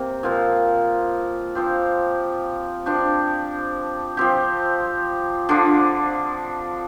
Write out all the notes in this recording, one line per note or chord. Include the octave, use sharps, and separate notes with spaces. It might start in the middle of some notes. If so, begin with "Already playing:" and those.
Already playing: C3 A#3
A#2 F3 C4 F4
F3 C4 G4
F3 D4 G4
F3 C4 G4
D3 F3 D4